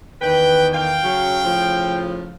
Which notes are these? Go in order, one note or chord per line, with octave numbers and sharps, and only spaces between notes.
E2 D#3 B4 G5
F5 G5
C#3 F#3
A2 C#3 F3